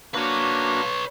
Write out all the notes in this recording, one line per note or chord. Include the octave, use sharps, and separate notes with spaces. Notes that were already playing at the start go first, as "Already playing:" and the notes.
A#3 D4 F#4 B4 C#5